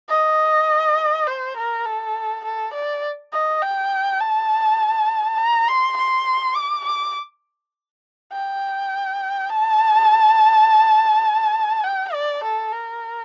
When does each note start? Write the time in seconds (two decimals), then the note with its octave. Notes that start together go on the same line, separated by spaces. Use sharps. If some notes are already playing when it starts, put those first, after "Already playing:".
0.09 D#5
1.27 C5
1.56 A#4
1.85 A4
2.44 A4
2.74 D5
3.32 D#5
3.61 G5
4.20 A5
5.38 A#5
5.68 C6
5.96 C6
6.55 D6
6.84 D6
8.32 G5
9.49 A5
11.84 G5
12.13 D5
12.43 A4
12.72 A#4